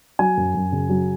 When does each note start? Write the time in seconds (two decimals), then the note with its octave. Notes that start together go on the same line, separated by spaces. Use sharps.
0.19 F#3 G#5
0.37 F#2
0.54 F#2
0.72 C#3
0.89 F#3